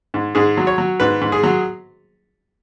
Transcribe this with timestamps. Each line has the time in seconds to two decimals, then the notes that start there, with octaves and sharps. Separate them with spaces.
0.14 G#2
0.35 G#2 G#4
0.57 F#3
0.67 C#5
0.78 F#3
1.00 G#2 B4
1.21 G#2
1.32 G#4
1.43 F#3